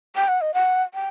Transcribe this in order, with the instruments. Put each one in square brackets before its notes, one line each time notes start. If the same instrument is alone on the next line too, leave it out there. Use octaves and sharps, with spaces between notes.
[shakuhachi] G5
F#5
D#5
F#5
G5